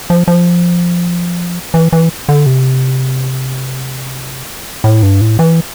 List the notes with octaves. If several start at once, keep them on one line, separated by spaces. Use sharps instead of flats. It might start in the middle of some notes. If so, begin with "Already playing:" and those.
F3
F3
E3
E3
D3
C3
A2
G2
A2
E3